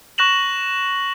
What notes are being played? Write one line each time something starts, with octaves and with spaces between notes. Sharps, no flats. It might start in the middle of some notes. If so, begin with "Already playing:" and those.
C#6 F#6 A#6 E7 F#7